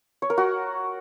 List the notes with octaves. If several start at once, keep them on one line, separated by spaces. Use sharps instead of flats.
C#5
A#4
F#4